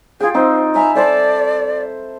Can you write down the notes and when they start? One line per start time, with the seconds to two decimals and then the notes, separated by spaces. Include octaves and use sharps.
0.20 F4 G#4 G5
0.34 C4 D#4 C5
0.75 E5 G#5 A#5 B5
0.95 A4 C5 D5 A5